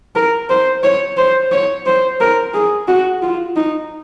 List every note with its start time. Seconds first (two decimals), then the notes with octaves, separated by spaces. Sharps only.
0.16 A#4
0.50 C5
0.83 C#5
1.18 C5
1.52 C#5
1.86 C5
2.20 A#4
2.54 G#4
2.88 F#4
3.22 F4
3.56 D#4